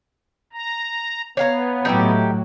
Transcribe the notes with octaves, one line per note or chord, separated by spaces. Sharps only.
A#5
B3 C#5 F5 A#5
A2 F#3 D#4 E4 G4